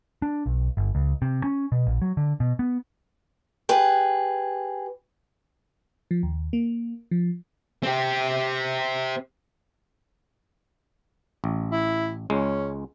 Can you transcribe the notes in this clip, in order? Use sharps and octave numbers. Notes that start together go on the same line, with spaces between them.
D4
B1
G1
C#2
C3
C#4
B2
A#1
F#3
D3
B2
B3
G4 G#4 B4
F3
D#2
A#3
F3
C4 G4
A1
E4
C#2 G#3 C#4